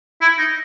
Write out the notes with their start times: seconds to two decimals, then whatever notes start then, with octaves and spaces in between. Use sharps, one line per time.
0.21 E4
0.38 D#4